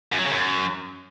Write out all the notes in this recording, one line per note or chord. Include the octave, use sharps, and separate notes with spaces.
F#2
F#3
C#3
F#2